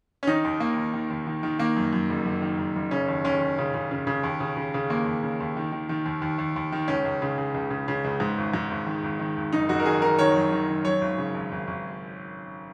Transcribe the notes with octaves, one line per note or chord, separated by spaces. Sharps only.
C#4
D#3 D#4
D#2
D#3 A#3
D#2
D#3
D#2
D#3
D#3
D#3 A#3
F#2
F#2
F#1
F#1
D#3
F#1
F#1
C#3 C#4
D#2
D#2 C#4
D#2
C#3
C#3
C#3
C#3
D#2
C#3
C#3
C#3
D#2 A#3
D#2
C#3
D#2
D#3
D#3
D#3
D#2
D#2
D#2
D#2
D#3
C#2 C#4
C#2
C#3
C#3
C#2
C#3
C#3
C#2
G#2
G#1
G#2
G#1
D#3
G#1
D#3
G#1
F#1 D#4
F#1 F#4
A#4
D#3 G#4
D#3 A#4
D#3 C#5
F#2
D#3
D#3
F#2 C#5
G#1
C#3
G#1
G#1
G#1